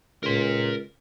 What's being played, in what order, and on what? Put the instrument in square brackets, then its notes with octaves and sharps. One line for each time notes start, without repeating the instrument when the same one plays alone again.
[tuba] C#2 [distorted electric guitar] A#4 C6